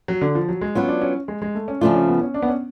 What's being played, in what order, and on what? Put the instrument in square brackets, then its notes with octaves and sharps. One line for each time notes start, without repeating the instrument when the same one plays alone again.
[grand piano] F#3
D3
F3
F#3
G#3
[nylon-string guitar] F#3 B3 F4 [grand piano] C#4
[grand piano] D4
C#4
G#3
G#3
A3
C#4
[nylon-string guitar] C#3 F3 A3 F4 [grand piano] D4
[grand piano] C#4
B3
C#4
D4
B3
C#4